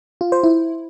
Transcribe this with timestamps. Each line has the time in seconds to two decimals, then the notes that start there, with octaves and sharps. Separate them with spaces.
0.21 F4
0.32 C5
0.43 E4